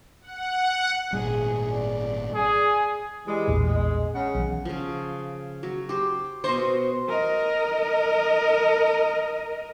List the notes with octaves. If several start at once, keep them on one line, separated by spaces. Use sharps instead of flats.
F#5
G#1 A#2 G3 G#4
D5
G#4
E3 G3 G#3
A#1 E2 A2
G#3
C#3 F#5
B1 E3
C#3 F3
F#3
G4 C5
B2 C5 D#5 C#6
F#4
A#4 D#5